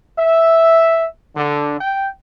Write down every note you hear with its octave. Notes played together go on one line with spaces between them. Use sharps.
E5
D3
G5